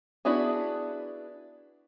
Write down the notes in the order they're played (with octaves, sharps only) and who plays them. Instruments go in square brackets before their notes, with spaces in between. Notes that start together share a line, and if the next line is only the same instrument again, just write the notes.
[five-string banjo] B3 D4 E4 F#4 G#4